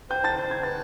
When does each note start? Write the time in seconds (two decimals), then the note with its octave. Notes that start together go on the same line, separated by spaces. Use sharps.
0.10 C5 G5 G6
0.24 A5 A6
0.37 C5
0.51 G#6
0.63 B4 A6